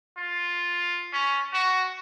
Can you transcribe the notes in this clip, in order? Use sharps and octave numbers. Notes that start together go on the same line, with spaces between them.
F4
C#4
F#4